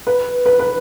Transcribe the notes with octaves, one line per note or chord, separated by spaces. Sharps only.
B4
B4
B4